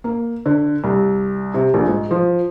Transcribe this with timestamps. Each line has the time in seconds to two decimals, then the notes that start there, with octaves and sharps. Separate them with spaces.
0.04 A#3
0.46 D3
0.84 C2
1.54 C3
1.74 A#1
1.88 G#2
2.11 F3